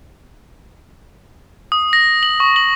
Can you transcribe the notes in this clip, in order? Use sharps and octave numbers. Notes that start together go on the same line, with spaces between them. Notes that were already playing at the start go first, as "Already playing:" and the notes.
D#6
A#6
F#7
C#6
F#7